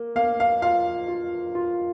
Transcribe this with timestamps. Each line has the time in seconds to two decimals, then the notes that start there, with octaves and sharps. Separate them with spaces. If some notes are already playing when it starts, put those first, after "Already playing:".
Already playing: A#3
0.16 A#3 F5
0.40 F5
0.62 F4 F5
1.08 F4
1.55 F4